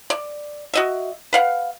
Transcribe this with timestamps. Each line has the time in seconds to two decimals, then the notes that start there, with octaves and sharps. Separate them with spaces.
0.10 D5
0.74 F#4 D#5 E5
1.33 B4 F5 F#5